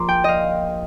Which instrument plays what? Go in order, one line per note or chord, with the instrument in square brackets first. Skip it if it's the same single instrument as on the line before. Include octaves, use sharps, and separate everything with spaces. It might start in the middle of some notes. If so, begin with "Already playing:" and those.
Already playing: [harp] A#1 A#2 A#5 C6 D6
G5
D#5 F5